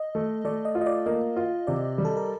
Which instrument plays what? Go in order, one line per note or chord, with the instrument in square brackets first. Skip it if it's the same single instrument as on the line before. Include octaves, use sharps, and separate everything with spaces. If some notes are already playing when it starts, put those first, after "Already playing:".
Already playing: [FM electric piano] D#5
[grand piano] A3
[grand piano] A3 [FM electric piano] D5
[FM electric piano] D#5
[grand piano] F4
[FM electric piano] D#5
D5
[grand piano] A#3 [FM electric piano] D#5
[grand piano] F4
[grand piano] C3 [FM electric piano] D5
[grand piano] G3
[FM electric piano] A4
A#4